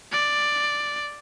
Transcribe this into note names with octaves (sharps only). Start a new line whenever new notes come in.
D5